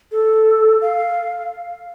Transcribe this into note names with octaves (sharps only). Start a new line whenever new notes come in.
A4
F5